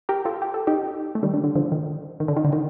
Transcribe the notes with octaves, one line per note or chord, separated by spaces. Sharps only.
G4 A#4
F4 A4
G4
A4
D#4 G4
A3
D#3 G3
D3
D3
D3 F3
D#3
D#3
D3
D#3
D3
D#3